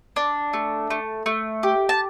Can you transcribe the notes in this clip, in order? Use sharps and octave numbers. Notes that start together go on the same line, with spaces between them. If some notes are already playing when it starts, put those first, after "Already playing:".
D4
A3
A3
A3
G4
A5